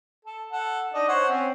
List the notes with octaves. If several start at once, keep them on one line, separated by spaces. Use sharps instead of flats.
A4
A4 F#5
D4 D#4 D#5
C5 C#5 F#5
C4 C#4